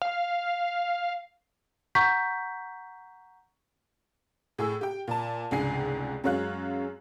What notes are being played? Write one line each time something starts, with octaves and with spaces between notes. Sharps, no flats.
F5
F#5 A#5 C#6 G6 B6
A2 G#4 E6
G4 G5
A#2 A5
F1 C#2 G#2 D4 G#5 C7
F#2 F#3 G#3 C#5 F5 F#6